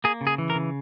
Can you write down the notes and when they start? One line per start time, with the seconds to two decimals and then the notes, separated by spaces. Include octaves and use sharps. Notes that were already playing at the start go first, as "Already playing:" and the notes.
0.04 A#3 G#4
0.21 C#3
0.27 G#4
0.38 E3
0.50 A#4
0.55 C#3